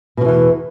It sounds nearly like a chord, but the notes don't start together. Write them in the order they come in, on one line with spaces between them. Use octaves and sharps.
B2 F3 E3 E2